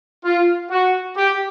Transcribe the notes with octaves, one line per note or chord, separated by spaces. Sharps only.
F4
F#4
G4